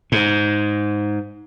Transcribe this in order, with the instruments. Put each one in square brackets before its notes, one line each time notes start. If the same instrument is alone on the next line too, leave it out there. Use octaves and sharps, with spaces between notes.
[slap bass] G#2